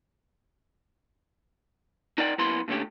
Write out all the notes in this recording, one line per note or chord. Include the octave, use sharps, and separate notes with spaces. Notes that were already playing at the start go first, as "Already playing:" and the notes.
D#4 A#4 D5 F#5 G5
F#2 A#3 B3 E4 B5 C6
A#2 D3 A3 C#4 G4